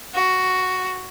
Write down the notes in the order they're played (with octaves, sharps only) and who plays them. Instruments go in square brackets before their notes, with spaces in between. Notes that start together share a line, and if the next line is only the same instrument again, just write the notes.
[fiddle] F#4